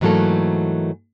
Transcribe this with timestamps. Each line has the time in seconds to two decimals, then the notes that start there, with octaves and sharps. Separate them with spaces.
0.01 G#2 E3 F#3 A3 A#3 A4